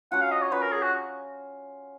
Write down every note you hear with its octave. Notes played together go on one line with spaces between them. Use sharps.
F#3 C#4 F4 F#5
F5
D#5
C#5
F#3 C#4 F4 B4
A#4
G#4
F#4